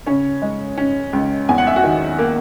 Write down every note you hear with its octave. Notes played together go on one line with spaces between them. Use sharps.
C#3 C#4 C#5
G#3
C#4
C#2
E2 G#5
F#5
E5
F#4 F#5
D#3
A#3